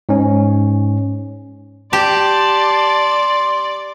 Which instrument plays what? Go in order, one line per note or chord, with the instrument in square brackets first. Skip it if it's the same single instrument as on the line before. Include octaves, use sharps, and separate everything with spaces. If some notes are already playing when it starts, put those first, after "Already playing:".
[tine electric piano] G#2 C#4
[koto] G4 [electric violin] D5 [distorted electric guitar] A5 [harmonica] C6